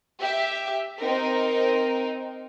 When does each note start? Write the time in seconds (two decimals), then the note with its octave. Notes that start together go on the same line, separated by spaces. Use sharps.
0.20 G4 E5
0.99 C4 D#4 A#4